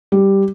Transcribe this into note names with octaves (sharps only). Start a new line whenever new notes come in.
G3